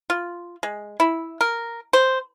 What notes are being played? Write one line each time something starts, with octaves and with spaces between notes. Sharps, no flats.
F4
G#3
E4
A#4
C5